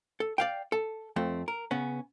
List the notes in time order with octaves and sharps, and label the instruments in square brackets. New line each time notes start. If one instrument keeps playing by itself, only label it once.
[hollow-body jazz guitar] A4
D5 F5 G5
A4
F2 A3 C4
A#4
C#3 B3 C#4